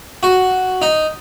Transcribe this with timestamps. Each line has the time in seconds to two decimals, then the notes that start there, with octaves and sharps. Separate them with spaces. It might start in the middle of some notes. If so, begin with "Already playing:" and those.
0.23 F#4
0.82 D#4